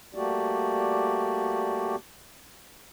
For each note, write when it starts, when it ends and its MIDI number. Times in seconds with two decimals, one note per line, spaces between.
0.15 1.96 55
0.15 1.96 57
0.15 1.96 58
0.15 1.96 66
0.15 1.96 67
0.15 1.96 74